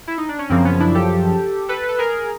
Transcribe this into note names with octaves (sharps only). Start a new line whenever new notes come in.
E4
D#4
D4
C#4
F#2 C#3 F3 A#3 C4
B3 C#4
D4 E4
G4 A4
A4 B4
A4
G#4 A#4